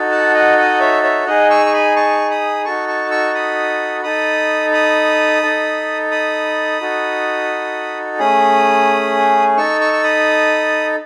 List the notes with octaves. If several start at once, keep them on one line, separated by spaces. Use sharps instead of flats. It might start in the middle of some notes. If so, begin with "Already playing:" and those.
Already playing: D#4 F#4 A4
F#5 A5
D#5 F#5
D#5 F#5
C#5 E5
C#5 E5
D#4 G#4 D#5 F#5
C#6 E6
C#6
G#5 B5
A5 C#6
B5 D#6
D#4 F#4 A4 A5 C#6
A5 C#6
C#6 E6
B5 D#6
D#4 A4 B5 D#6
B5 D#6
D#4 A4
B5 D#6
D#4 F#4 A4
A3 C#4 G#4 B5 D#6
D#4 A4 C#6 E6
C#6 E6
E6
B5 D#6